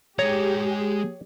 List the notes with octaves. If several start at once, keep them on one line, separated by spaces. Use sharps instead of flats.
G#3 G4 G#4 C#5 A#5